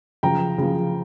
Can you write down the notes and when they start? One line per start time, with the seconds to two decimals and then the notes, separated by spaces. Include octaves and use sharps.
0.23 C#3 F3 G5 A#5
0.58 C#3 F3